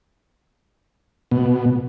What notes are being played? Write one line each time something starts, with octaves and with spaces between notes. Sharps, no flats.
B2